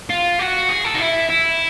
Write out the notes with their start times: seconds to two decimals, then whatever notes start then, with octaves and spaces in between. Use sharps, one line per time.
0.09 F4
0.39 F#4
0.69 G#4
0.84 A4
0.95 D#4
1.00 E4
1.29 E4